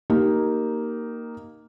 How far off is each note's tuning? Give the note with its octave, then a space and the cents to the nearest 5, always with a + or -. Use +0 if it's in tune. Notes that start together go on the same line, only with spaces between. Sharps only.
A#3 +0 D#4 +0 G4 -20